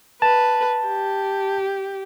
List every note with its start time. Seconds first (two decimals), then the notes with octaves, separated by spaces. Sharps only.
0.22 B4 A5
0.86 G4